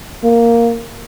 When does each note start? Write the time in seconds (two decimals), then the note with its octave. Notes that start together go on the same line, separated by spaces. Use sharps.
0.24 A#3